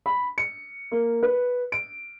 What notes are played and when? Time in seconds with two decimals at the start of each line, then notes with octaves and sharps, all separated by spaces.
0.06 B5
0.38 C#7
0.92 A#3
1.23 B4
1.72 D7